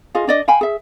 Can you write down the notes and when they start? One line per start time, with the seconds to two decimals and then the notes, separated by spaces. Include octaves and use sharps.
0.15 F4 G#4 D#5 F5
0.27 D4 D5 D#5
0.48 F5 G5 G#5 B5
0.61 G#4 E5